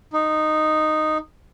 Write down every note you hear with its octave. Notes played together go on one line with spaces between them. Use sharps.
D#4